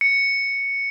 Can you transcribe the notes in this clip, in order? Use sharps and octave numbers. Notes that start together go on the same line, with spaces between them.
C#7